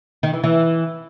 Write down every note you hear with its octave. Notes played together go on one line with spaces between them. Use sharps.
D#3
E3
E3